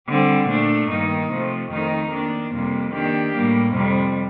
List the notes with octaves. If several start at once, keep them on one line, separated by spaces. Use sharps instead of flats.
D3 G3 C4
A#2 A3 D4
G2 D#3 A#3 D#4
C3 F3 A3
F2 D#3 A3 D#4 A#4
D#3 A#3 D4
F2 C3 G3 A#3
D#3 A#3 D4 G4
A2 G3 A#3
F2 C3 G3